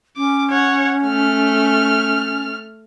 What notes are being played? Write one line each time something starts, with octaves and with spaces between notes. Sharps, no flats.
C#4 D6
C#5 F#5
A3 F6